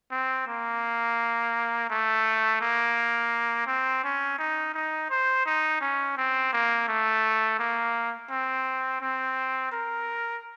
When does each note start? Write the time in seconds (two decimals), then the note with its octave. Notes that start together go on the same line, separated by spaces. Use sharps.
0.11 C4
0.47 A#3
1.90 A3
2.61 A#3
3.67 C4
4.04 C#4
4.38 D#4
4.74 D#4
5.10 C5
5.46 D#4
5.81 C#4
6.17 C4
6.53 A#3
6.88 A3
7.59 A#3
8.30 C4
9.01 C4
9.72 A#4